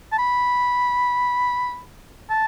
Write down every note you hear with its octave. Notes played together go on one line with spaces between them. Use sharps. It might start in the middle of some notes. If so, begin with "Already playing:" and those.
A5
B5
A5